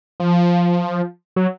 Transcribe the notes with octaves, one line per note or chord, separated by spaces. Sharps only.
F3
F#3